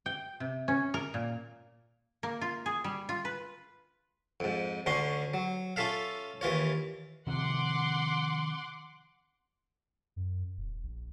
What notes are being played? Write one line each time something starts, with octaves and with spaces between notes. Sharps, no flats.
G5
C3
C#4
A#4
A#2
A#3
F4
G#4
G3
F4
B4
F2 G#2
D2 D3 C#4 C6 C#6
F#3
C#4 F4 A4 E5 F5
D#2 E3 F4 C#5
C3 D#3 F3 F#5 C6 D6
F#2
D#1
A#1